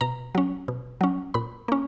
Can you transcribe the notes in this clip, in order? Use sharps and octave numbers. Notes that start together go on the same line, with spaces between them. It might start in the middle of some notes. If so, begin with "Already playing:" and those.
B2 A#5
F#3 C#4
B2
F#3 C#4
A#2 B5
A#3 C#4